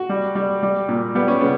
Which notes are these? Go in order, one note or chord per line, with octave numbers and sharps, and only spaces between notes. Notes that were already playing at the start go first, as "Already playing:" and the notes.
Already playing: F#4
G3
G3
G3
A#2
G3 B3
C#4
C#3 B3